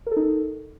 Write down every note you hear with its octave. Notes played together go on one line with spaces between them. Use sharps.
D#4 A4 A#4